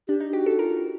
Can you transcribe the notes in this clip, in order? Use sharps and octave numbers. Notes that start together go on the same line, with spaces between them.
D4 G4
D#4
F#4 G4
A4
F4 A#4